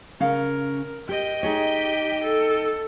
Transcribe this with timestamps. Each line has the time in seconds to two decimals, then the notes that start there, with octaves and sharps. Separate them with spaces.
0.20 C#3 C#4 A#4 F5
1.09 G4 D#5 G5
1.43 D#4 G4 G#4 C#5
2.24 A4